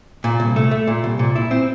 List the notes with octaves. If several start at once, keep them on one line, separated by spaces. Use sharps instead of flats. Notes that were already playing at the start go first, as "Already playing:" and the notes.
A#2
C2
A3
A3
A#2
C2
A#2
E4
C4